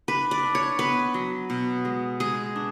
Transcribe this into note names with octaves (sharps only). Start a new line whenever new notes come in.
D4 B4
D5
D4
C#5
B3 B4
F#3
B2
G#3
G#3 G#4
D4